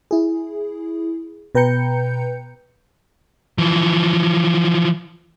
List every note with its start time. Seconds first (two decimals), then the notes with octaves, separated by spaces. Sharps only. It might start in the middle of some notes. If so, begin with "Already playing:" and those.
0.11 E4 G#4
1.55 B2 B4 G5 A#5 G6 C#7
3.58 E3 F3